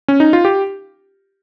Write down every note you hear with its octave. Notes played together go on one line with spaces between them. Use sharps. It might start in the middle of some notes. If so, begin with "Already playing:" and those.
C#4
D#4
F4
G4